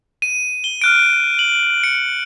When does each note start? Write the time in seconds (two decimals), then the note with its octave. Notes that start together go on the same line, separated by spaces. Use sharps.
0.22 D#7
0.64 G7
0.82 F6 F#6 D7
1.39 F#7
1.84 C#7